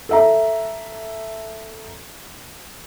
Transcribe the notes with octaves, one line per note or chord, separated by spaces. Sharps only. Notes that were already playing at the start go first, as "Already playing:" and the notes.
A4 E5 A#5